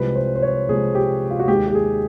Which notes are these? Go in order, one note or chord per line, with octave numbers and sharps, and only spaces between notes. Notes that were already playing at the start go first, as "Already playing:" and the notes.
Already playing: C2 C3 F3 G#3 B4
C5
C5
C#5
C2 C3 F3 G#3 G#4
G4
F4
F#4
D#2 D#3 G#3 G4
G4
G#4